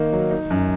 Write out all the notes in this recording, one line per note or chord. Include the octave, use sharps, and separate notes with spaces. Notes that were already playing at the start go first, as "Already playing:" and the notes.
Already playing: D#3 A#3 D#4
F#3
D#4
F#2